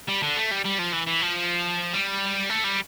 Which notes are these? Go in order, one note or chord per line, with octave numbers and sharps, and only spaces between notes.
G3
D3
A3
G3
G3
F3
E3
E3
F3
G3
A3
G3